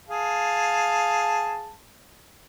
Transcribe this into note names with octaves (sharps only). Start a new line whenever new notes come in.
G#4 F5 A5